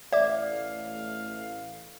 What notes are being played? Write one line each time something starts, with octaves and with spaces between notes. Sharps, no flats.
A1 A3 D5 E5 F5 D6